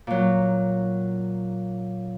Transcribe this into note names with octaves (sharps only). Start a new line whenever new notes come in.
A#2 F#3